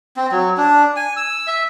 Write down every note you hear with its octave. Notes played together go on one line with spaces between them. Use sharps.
C4
F#3
D4
G#5
E6
E5